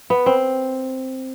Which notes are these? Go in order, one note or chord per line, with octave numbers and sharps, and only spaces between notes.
B3
C4